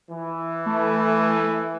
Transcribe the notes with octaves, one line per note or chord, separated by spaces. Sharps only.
E3
A3